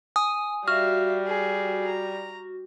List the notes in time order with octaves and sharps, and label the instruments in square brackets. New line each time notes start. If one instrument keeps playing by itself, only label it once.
[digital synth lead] G#5 [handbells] D#6
[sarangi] G3 [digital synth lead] F#4 [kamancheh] E5 F5 [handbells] F6
[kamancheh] G#4
A#5